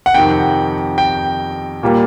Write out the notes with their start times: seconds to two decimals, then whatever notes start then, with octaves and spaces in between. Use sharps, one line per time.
0.06 F#5
0.14 F2 C3 D#3 G5
0.98 G5
1.83 A#2 G3 A#3